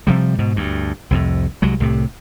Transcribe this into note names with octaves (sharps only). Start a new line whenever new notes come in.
C3 F3 G3
G#2 B2
D2 G2
C2 F2 A2
C2 F#3 G#3
C2 A2 C3